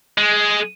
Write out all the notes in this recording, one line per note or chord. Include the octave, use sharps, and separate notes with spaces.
G#3